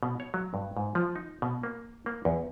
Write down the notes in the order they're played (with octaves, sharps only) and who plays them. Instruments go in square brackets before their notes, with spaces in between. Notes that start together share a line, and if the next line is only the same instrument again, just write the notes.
[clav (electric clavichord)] B2
C#5
F#3
G2
G#2
F3
D#4
B2
A#3
A#3
E2